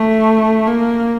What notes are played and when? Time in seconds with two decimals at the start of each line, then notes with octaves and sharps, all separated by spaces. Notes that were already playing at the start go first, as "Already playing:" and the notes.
Already playing: A3
0.67 A#3